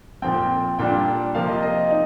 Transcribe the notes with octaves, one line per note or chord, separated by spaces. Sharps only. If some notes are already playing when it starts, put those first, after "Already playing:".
A#2 F3 C4 G5
A#2 G3 D4 F4 G5
C3 F3 A#3 F4 F5
D#5
D#5
D#4